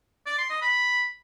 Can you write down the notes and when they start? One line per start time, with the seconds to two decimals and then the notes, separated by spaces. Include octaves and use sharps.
0.26 D5
0.38 C6
0.50 D#5
0.62 B5